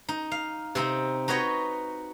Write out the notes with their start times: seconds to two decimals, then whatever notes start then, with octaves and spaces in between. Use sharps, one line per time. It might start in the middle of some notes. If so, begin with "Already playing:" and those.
0.09 D#4
0.31 F5
0.75 C3 C4 D#4
1.28 D#4 F#4 B4 C#5 D#5